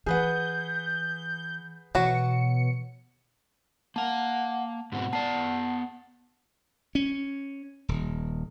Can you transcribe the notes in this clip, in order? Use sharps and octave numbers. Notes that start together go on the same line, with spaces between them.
E3 G#4 B4 F#5 G6
B2 E3 F#3 F#4 C#7
A#3 F5 F#5 A5
G#2 B2 C4 F#5
B3 D5 A5 C7
C#4
D#1